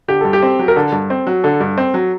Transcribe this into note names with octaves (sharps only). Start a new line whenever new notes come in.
D3 G4
G2 A4
G4
C4
F#3
A#4
D3 A4
G2
C4
F#3
D3 A4
G2
C4
F#3